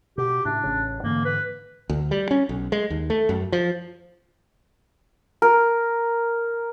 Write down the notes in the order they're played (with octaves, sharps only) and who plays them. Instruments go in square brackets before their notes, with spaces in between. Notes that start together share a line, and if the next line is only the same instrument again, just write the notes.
[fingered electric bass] B2 [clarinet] G4
[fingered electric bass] A2 C#3 [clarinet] D4
[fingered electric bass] A1 C#3
[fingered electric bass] G#2 D3 E3 [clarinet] A#3
[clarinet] B4
[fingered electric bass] D2
G3
C#4
B1
G#3
D#2
A3
F#2
F3
[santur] A#4